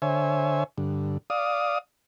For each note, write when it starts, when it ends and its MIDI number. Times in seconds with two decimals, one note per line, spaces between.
0.02 0.64 50
0.02 0.64 72
0.02 0.64 73
0.02 0.64 76
0.02 0.64 80
0.78 1.18 43
0.78 1.18 50
1.30 1.78 74
1.30 1.78 77
1.30 1.78 87